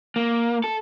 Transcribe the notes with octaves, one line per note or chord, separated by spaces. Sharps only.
A#3
A4